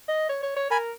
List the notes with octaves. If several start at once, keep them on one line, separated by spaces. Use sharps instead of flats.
D#5
C#5
C#5
C#5
A#4 G#5 B5